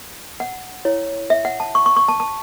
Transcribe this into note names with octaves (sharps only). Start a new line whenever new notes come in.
F#5
E4 C#5
E5
F#5
A5
C#6
C#6
C#6
A5
A5